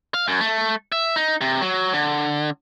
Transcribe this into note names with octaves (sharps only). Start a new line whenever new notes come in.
F5
F#2
A3
E5
D#4
C3
F#3
D3